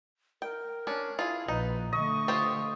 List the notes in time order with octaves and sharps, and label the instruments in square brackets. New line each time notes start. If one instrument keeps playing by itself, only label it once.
[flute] A#4 [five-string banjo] G5
[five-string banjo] C#4 D4
[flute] E4 [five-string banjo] F4 G#4
[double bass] A#1 [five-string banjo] D#4 [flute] B4
[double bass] D3 A3 [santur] D#5 [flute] C#6
[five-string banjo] F4 G4 C5